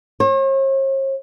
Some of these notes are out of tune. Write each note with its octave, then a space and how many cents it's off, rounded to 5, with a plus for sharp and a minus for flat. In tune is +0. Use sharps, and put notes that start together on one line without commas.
C#5 -45